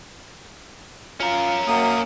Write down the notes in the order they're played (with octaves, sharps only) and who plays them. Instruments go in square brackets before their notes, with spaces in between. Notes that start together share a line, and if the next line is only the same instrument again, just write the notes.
[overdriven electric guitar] C#4 A#4 [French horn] F4
[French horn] F#2 [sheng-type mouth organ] A#3 D#6